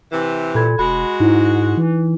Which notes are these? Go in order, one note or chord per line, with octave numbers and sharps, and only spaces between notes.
C3 E3
A#2 A4 B5 G#6
E1 G#3 F#4 B5
G#2 D#4 E4
E3